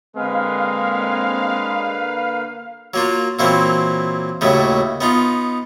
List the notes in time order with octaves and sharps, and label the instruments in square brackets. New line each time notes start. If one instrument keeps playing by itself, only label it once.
[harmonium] D3 A#3 B4 [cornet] G#3 [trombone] C4 [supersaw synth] F5
[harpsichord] F#3 A#3 F4
A#2 E3 F#3 A#3 C4
D#2 A2 C#3 F#3 A3
B3 D#4 F4